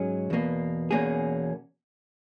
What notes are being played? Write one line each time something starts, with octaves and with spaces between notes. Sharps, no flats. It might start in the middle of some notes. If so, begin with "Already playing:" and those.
Already playing: G#2 F#3 C#4 G#4
E2 B2 A#3
E2 B2 A#3 C#4 G#4